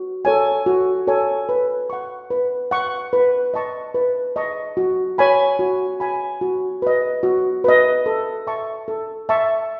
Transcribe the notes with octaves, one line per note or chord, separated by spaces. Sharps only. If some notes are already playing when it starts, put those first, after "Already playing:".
Already playing: F#4
A4 C#5 G#5
F#4
A4 C#5 G#5
B4
F#5 C#6
B4
F#5 C#6
B4
D#5 A5 C#6
B4
D#5 A5 C#6
F#4
C#5 G#5 B5
F#4
C#5 G#5 B5
F#4
B4 D#5
F#4
B4 D#5
A4
E5 A5 C#6
A4
E5 A5 C#6